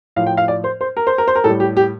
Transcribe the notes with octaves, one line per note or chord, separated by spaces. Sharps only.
A2 F3 F5
G5
F5
D5
C5
C5
A#4
C5
A#4
C5
A#4
A2 G3 A4
G4
G4